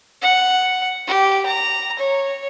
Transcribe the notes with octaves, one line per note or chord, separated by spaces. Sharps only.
F#5
G4
A#5
C#5